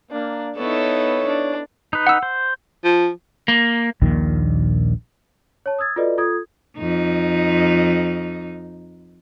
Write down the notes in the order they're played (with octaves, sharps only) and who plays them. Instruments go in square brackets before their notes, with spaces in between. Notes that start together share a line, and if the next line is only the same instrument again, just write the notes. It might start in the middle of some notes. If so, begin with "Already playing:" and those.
[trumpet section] A#3 [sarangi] D4
[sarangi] B3 [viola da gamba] D#4 E4 A4 [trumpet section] C#5
[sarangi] D4
[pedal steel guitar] D#4 B4
[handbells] F#5 E6
[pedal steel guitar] C5
[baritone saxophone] F3
[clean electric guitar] A#3
[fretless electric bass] A#1 D#2 A#2 D#3
[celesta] C#5 A5
D#6 E6 G#6 A6
F4 F#4 A4 B4 D5 D#5
F4 A4 D#6 G#6
[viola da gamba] F2 D#4